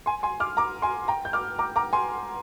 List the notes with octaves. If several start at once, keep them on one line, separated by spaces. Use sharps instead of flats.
G#5 C6
G#5 C6
D6 F6
A#5 D6
G#5 C6
G5 A#5
G6
D6 F6
A#5 D6
A#5 D6
G#5 C6